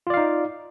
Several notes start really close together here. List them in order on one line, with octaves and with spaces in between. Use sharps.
F4 D5 F5 D#4